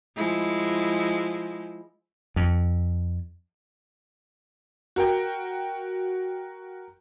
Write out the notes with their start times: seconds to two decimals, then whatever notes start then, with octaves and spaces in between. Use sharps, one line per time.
0.16 F3 G#3 E4
2.36 F2
4.96 F#4 A#4 G5